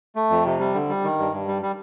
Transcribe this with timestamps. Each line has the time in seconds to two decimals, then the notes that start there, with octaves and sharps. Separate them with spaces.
0.15 A3
0.30 F2
0.45 C3
0.60 G3
0.74 D3
0.89 G3
1.04 D#3
1.18 G2
1.32 G2
1.48 G3
1.62 G3